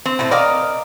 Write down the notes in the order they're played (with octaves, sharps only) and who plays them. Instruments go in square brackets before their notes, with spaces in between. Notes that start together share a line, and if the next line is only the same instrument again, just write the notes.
[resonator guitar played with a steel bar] C4
[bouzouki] A2 A3 A4
[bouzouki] A#4 D#5 F5 [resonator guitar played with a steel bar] D5